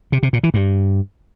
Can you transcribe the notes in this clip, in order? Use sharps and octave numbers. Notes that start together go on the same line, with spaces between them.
C3
C3
A#2
E3
G2